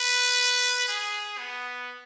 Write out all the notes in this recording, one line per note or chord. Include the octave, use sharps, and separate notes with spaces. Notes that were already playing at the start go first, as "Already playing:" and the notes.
Already playing: B4
G#4
B3